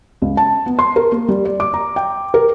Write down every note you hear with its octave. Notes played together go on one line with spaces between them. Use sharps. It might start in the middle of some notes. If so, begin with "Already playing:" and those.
C#2
A5
B3
C6
A#4
A#3
G3
D5
D6
A#5
G5
A#4